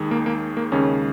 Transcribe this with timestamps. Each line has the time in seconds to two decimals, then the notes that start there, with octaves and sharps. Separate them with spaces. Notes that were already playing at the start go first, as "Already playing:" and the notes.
Already playing: D#2 D#3 G#3
0.11 A#3
0.26 A#3
0.57 A#3
0.72 D#2 C#3 G#3 C#4